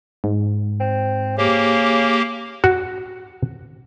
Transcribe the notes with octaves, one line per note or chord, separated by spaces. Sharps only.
G#2
C4
C#3 A#3 G4
F#4